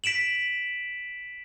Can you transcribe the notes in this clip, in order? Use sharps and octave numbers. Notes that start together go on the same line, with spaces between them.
B6 D7 E7 F#7